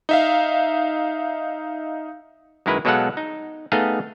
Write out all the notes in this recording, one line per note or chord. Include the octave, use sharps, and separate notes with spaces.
D#4 E5 F5
F#2 D#3 G#3 E4 A#4 B4
B2 F#3 G#3 A4 F5 F#5
D#4
A3 B3 D#4 G#4 D#5 F5